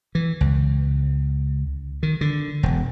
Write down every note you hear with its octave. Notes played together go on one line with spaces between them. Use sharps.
E3
C#2
D#3
D3
E1